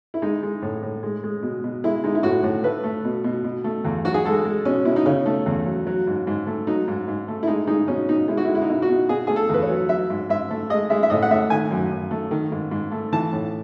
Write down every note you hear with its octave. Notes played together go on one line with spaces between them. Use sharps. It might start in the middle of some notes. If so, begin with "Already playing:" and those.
E4
G#3 D#4
G#3
A2
A2
G#3
G#3
B2
B2
G#3 E4
G#3 D#4
E4
A2 F#4
A2
A3 B4
A3
B2
B2
B2
A3
E2
F#3 F#4
G#4
G#3 A4
G#3
B2 C#4
B2 E4
D#4
C#3 C#4
A3
E2
F#3
F#3
G#2
G#2
A3
F#3 D#4
G#2
G#2
A3
E4
G#3 D#4
G#3 D#4
B2 C#4
B2 D#4
G#3 E4
F#4
E4
G#3
E4
D#4
B2 E4
F#4
B2
B2 G#4
A3 G#4
A4
E2 B4
C#5
F#3
F#3 E5
G#2
G#2 E5
A3
G#3 D#5
G#3 E5
E5
A2 D#5
F#5
A2 E5
D#3 G#5
F#2
F#2
A3
D#3
G#2
G#2
A3
E3 A5
A2